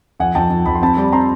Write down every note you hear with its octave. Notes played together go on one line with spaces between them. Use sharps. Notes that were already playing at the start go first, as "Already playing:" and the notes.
F2 F#5 G#5
F2 G5 A5
F2
F2 B5
C6
C4 A5 B5
G3
C4 A#5 C6